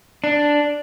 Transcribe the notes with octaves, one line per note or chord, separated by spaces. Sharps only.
D4